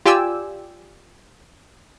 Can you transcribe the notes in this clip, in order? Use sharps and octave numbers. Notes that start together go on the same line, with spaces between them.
F4 G4 D5 G5 G#5 E6